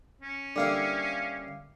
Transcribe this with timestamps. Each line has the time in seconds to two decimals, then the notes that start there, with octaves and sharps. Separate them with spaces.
0.21 C#4
0.56 D3 G3 A#3 E4 F5 C7